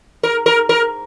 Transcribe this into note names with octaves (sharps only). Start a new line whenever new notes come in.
A#4
A#4
A#4